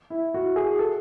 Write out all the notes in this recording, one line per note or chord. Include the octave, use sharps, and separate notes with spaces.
E4
F#4
G#4
A4